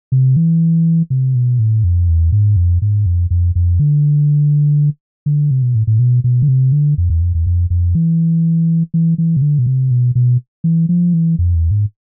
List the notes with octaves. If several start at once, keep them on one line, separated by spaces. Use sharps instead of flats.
C3
E3
C3
B2
A2
F2
E2
G#2
F2
G#2
F2
F2
F2
D3
D3
C3
B2
A2
A2
B2
B2
D3
C3
D3
F2
E2
F2
E2
F2
F2
E3
E3
E3
C3
D3
B2
C3
B2
B2
E3
F3
E3
F2
E2
G#2